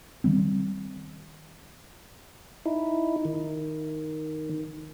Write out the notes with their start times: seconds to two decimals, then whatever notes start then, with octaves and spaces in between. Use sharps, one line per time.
0.24 D#3 G3 C4
2.66 D#4 E4
3.25 D#3